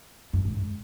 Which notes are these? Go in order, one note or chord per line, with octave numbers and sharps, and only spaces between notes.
F#2
G#2